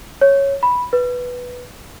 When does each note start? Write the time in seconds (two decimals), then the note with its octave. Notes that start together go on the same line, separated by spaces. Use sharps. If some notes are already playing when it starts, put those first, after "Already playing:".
0.21 C#5
0.63 B5
0.93 B4